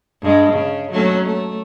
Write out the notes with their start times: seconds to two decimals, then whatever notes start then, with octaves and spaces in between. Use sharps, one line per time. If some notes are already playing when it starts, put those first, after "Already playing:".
0.22 G2 G#3
0.52 C#3
0.92 F#3 A3 C#4
1.25 A3